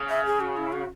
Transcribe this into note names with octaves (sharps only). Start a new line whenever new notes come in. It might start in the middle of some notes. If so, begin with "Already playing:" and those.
Already playing: C#3
E5
G#4
F#4
E4
F#4